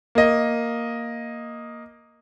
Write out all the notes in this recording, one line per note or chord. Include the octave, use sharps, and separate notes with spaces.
A#3 D#5